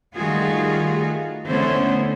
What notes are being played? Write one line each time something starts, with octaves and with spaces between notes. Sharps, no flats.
D#3 G3 A3 F4 F#4 G#4
D3 A3 B3 C#4 E4 C5